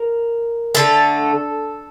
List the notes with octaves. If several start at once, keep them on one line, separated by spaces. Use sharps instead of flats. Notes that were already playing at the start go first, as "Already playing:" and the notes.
Already playing: A#4
D3 A3 A4